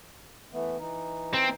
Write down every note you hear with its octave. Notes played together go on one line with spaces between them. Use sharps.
E3 A3 B3
E3 D#4
C4